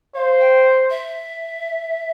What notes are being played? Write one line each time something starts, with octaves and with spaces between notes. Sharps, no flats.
C5 F5
G5
E5